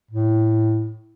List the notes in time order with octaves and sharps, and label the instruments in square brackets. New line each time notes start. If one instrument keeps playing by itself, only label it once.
[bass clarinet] A2